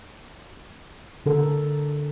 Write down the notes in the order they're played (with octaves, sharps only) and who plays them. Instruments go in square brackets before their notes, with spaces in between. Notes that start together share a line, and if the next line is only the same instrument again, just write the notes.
[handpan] D3 A4 A#4